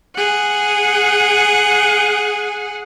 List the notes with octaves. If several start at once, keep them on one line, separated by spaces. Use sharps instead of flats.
G#4 F#5